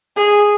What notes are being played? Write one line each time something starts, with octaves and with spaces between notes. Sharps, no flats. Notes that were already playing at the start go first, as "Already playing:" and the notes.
G#4